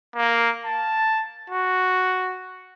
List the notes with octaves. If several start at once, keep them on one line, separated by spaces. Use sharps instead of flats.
A#3
A5
F#4